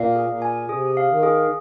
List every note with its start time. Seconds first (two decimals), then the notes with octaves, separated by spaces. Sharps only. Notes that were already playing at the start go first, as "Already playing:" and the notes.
Already playing: A#2 F5
0.15 G#4
0.29 A#2
0.42 G#5
0.69 C3 G#4
0.97 F5
1.10 D#3
1.23 G#4